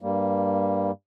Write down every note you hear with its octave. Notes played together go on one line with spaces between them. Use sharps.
G2 G3 A#3